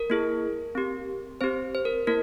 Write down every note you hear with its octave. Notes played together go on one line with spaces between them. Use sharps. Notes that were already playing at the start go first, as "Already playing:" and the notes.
Already playing: A#4
A#3 E4 G#4
C4 G4
C4 G4 C5
C5
A#4
A#3 E4 A#4